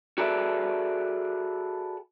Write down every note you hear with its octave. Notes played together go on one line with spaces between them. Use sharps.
F#4 G#4 A4 B4 D5 E5